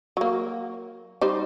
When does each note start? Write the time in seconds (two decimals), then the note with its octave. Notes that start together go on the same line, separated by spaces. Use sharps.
0.17 F#3 A#3
1.21 G3 D#4 C5